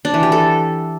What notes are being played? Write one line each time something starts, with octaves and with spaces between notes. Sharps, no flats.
D4
E3
G4
A4